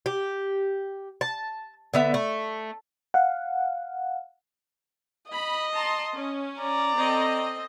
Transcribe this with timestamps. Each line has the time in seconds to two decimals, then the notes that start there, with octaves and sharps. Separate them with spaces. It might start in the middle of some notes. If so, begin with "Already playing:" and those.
0.06 G4
1.21 A5
1.94 D3 B3 E5
2.14 A3
3.14 F5 F#5
5.31 D#5 B5
5.72 A5 A#5 C6
6.16 C#4
6.60 D5 A#5
6.97 C4 A4 D#5